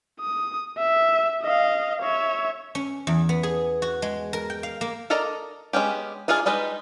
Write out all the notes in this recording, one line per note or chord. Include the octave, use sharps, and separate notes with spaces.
D#6
E5
D#5 F5
C#5 E5
C#4
E2
B3
G#4
F#4
G#3
A#4
G5
F5
A#3
A4 A#4 D5 D#5 A#5
G#3 B3 C#4 G4
D4 D#4 F4 G#4 F5
G3 G#3 D#4 B4 D#5